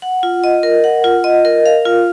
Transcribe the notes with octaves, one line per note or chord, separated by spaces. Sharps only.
F#5
F4
D#5
A#4
F#5
F4
D#5
A#4
F5
F4